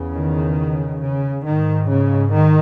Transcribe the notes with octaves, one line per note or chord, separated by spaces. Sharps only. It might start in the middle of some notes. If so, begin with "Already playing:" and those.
Already playing: E2 C#3
D#3
C#3
G#2 D#3
C#3
D#3